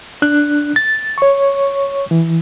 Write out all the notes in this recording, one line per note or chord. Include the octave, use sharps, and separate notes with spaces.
D4 F#6
A6
C#5 C#6
E3